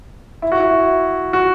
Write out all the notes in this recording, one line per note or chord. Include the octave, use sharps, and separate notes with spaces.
E4
F#4
E4
F#4